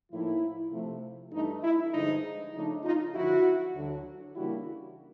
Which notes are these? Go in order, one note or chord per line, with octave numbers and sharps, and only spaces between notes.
A2 F3 A#3 D#4 E4
C3 F3 A3
G2 E3 A3 D4 D#4
E4
G2 D3 F3 G#3 D#4
C#3 F3 A3 D4 D#4
D#4 F4
F#2 D3 F3 E4 F#4
D2 D3 F#3
C#3 E3 G3 A#3 D4 E4 F#4